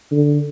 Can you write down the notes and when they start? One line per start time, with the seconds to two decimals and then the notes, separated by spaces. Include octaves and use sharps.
0.12 D3